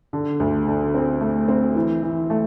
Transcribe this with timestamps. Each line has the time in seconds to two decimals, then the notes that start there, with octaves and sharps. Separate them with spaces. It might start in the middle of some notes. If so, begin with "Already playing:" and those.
0.13 D3
0.40 D2
0.67 D3
0.95 C4
1.21 A3
1.48 C4
1.75 E3
2.03 E3
2.30 A3